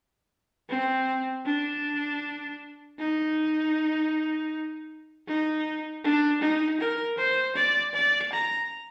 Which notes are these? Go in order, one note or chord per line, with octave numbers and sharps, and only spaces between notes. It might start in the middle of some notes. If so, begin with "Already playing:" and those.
C4
D4
D#4
D#4
D4
D#4
A#4
C5
D5
D5
A#5